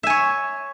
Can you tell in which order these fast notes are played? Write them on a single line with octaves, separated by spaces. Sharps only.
E5 G#5 C#5